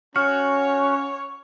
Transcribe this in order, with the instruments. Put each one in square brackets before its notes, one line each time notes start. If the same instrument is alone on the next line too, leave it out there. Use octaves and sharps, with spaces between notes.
[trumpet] C#4 [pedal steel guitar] F#4 [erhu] C#5 [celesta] F6